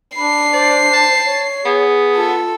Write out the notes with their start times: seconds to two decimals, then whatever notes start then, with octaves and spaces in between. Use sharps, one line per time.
0.16 D4 B5 C7
0.53 C5 D5
0.93 A5
1.26 C#5
1.65 B3 G#4
2.16 F4 A4